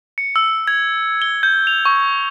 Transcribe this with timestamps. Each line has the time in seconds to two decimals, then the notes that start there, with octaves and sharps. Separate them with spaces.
0.18 C#7
0.36 E6
0.68 G#6
1.22 G7
1.43 G6
1.67 F7
1.85 C#6